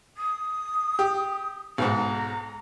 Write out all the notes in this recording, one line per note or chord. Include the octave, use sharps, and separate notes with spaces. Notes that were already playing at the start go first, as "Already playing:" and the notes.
D#6
G4
B1 G#2 A#5